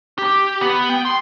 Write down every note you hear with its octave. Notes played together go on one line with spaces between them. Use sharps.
G4
B3
G5
C6